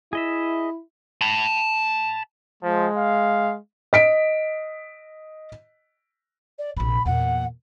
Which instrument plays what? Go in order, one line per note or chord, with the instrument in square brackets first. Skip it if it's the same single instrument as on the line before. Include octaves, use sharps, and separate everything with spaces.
[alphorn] E4 [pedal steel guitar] G#4 D#5 E5
[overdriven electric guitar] A5 B5
[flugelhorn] F3 [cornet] G#3
[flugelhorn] F5
[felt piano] D#5 B6 D7
[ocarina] D5
[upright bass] A#1 C3 [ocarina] B5
[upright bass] E2 A#2 [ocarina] F#5